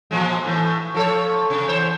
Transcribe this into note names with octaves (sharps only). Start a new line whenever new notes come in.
A#2 F3 G#3
A2 E3
F3 A4 C#5
C3
E2 C5 C#5